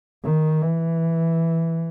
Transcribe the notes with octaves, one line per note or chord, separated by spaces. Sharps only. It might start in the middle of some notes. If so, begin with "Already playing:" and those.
D#3
E3